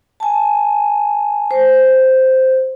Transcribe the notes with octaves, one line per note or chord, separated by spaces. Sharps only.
G#5 A5
C5